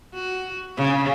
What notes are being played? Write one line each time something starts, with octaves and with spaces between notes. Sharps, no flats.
F#4
C#3